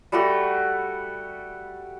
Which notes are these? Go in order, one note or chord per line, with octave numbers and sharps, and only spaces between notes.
G3 A3 F#4